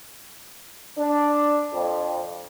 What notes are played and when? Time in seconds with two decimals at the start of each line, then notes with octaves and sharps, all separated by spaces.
0.98 D4
1.73 F2